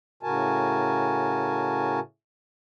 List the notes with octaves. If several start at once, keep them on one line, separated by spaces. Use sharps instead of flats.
A2 C#3 F#4 A#4 G#5 A5